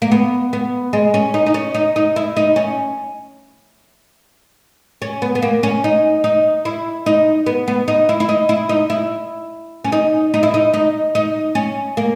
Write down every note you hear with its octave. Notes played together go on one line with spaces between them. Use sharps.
A#3
B3
B3
G#3
C#4
D#4
D#4
C#4
D#4
D#4
E4
D#4
C#4
C#4
B3
B3
A#3
C#4
D#4
D#4
E4
D#4
B3
B3
D#4
E4
E4
D#4
E4
D#4
E4
C#4
D#4
D#4
E4
D#4
D#4
D#4
C#4
A#3